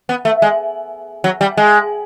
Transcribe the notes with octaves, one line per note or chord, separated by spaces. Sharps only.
B3
A3
G#3
F#3
G3
G#3